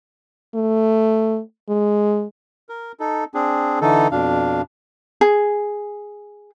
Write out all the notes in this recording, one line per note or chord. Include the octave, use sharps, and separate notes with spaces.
A3
G#3
A#4
D#4 A4
C4 D4 G#4
D3 E3 D#4 A4
F2 B2 D4 F5
G#4